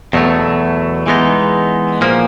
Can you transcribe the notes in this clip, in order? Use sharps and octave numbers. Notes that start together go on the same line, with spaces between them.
E2 B2 F#3 A3
E3 G#3 B3 D#4
A#2 F3 A#3